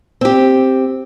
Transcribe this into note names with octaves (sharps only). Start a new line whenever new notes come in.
C4 G4